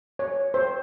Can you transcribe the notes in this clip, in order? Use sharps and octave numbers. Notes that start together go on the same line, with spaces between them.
C#5
C5